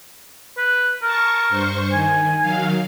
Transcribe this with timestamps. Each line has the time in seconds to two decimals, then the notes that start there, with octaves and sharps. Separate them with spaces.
0.58 B4
1.03 A#4 A5 C#6
1.49 G2 C5 C#6
1.93 D#3 G#5
2.41 D#3 F#3 F5